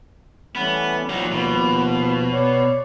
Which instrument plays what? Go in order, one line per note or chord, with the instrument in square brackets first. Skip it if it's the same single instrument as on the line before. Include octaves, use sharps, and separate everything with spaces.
[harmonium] E3 A3 C#4 [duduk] G3 [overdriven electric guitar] B3
[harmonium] D#2 F3 [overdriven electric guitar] F#3 D#4
[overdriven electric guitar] B2
[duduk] C#5 [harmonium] D5